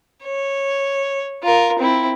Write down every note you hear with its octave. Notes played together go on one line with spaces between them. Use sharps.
C#5
F4 A#4
C4 E4